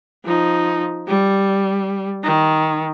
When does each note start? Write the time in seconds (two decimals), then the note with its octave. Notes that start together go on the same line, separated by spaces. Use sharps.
0.24 F3 D#4
1.08 G3
2.24 D#3